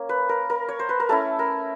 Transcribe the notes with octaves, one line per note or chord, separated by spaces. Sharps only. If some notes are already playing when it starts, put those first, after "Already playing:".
Already playing: A#3 C#4
B4
A#4
A#4
C#5
C5
B4
A#4
A3 C#4 E4 A4
A#4